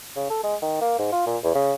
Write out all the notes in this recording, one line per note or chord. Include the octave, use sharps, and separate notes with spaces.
C#3
A4
G#3
D#3
A#3
G#2
F4
A#2
E2
C#3